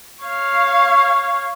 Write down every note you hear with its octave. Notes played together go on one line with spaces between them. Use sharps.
C#5 F5